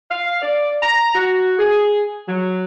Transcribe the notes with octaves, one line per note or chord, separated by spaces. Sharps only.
F5
D5
A#5
F#4
G#4
F#3